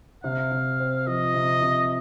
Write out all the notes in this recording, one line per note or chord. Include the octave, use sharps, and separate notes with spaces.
C3 F5
C3
C4
F3 D#5
C3
C3